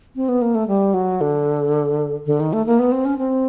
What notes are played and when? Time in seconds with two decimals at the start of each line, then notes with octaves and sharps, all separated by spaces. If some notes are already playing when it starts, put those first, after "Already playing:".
0.16 C4
0.29 B3
0.42 A#3
0.55 A3
0.68 G3
0.94 F#3
1.21 D3
2.26 D3
2.40 D#3
2.53 A3
2.66 A#3
2.79 B3
2.92 C4
3.05 C#4
3.19 C4